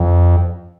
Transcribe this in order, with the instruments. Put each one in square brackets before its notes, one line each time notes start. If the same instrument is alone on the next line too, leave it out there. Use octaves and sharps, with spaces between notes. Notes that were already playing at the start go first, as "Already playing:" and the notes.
Already playing: [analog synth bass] F2